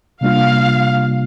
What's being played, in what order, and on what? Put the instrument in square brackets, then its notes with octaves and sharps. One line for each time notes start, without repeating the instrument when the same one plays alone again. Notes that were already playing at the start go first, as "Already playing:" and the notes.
[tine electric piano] C3 G3 A#3 D4 F4 [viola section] F5